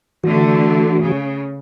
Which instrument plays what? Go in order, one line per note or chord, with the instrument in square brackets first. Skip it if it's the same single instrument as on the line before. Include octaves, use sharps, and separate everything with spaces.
[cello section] D3 A3 [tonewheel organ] E3 F#4
[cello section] C#3